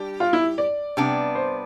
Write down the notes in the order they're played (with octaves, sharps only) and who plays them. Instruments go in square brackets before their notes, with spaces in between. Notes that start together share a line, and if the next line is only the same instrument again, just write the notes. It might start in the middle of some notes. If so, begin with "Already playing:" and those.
Already playing: [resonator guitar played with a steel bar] G3 D4 G4
[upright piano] F4
E4
D5
[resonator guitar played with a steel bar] C3 G3 B3 D4
[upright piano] C5